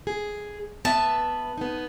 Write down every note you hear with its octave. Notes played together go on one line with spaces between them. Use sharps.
G#4
B3 B4 E5 A5
B3 D#4